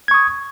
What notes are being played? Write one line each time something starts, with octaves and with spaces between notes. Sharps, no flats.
C#6 D#6 G#6